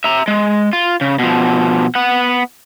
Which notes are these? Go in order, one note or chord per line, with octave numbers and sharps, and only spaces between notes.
E5 A#5
G#3
F4
C#3
B2 F3
B3 F#5